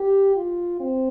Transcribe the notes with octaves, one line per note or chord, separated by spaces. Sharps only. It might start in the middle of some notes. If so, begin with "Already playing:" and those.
Already playing: G4
F4
C4